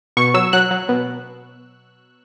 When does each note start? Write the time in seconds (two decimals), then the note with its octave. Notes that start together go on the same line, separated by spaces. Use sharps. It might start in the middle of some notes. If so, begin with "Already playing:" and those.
0.17 B2 C#6
0.34 F#3 E6
0.53 F#3 F#6
0.71 F#3
0.89 B2